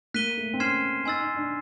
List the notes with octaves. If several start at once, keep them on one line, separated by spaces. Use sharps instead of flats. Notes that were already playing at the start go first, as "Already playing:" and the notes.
A#3 F#6 B6 D#7 G7
A3
C4
C#4 C6 F6 G#6 C7 E7
D#4 G#5 C6 E6 A6
D#4
D4